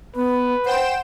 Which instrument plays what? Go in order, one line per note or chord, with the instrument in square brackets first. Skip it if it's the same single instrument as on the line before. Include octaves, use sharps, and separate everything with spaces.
[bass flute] B3 [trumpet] B4
[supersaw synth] C5 G5 E7 [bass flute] F#5